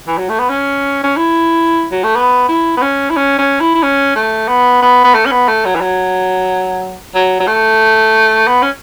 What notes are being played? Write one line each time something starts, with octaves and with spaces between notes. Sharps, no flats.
E3
F#3
A3
B3
C#4
C#4
E4
F#3
A3
B3
E4
B3
C#4
E4
C#4
C#4
E4
E4
C#4
A3
B3
B3
B3
A3
C#4
B3
A3
F#3
E3
F#3
F#3
F#3
A3
B3
C#4